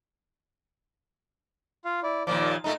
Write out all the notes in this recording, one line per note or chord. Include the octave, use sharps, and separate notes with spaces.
F4 F5
E4 D5
D#2 A#2 F3 D5 D6
A#2 A3 D#4 A#5